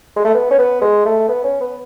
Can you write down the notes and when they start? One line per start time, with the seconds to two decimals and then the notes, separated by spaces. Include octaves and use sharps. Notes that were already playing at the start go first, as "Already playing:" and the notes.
0.16 G#3
0.25 A3
0.34 B3
0.51 C#4
0.59 B3
0.81 G#3
1.05 A3
1.28 B3
1.44 C#4
1.60 B3